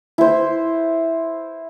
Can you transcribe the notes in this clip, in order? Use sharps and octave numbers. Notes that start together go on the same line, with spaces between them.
E4 C5